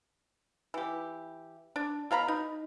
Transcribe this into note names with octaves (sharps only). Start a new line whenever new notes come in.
E3 G4
D4
B2 F5 A#5 B5
D#4